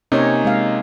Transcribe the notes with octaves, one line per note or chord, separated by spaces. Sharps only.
C3 A#3 C#4 D#4 C#5
G#3 F5